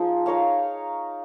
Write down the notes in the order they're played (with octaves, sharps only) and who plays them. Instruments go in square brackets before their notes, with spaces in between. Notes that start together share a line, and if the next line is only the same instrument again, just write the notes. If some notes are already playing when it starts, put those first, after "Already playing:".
Already playing: [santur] F3 D#4 G#4
D#4 A#4 C#5 F5